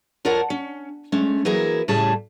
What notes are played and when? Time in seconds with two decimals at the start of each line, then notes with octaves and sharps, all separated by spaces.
0.25 F2 F4 A#4 C#5 F#5 A5
0.50 C#4
1.12 G#3 A3 C#4
1.45 E3 F#3 A#3 E4 G#4 A#4
1.88 A2 C#3 G3 A3 G#4 A5